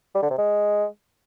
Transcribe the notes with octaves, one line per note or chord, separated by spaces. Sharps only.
G3
D3
C3
G#3